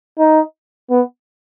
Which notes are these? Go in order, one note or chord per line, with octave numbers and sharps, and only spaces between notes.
D#4
B3